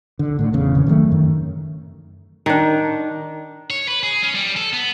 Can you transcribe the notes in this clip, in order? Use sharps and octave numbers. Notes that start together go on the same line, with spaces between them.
D3
A2 D3
F1 E2 C#3
C#3 E3 C4
D#3 F#3 G#3 A3
F#2 D#3
D#3 D4
C#5
B4
G#4
C#4
G3
A4
B3